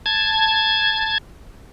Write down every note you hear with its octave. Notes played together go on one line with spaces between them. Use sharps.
A5 G#6